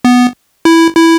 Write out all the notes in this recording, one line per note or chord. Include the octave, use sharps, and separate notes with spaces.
B3
E4
E4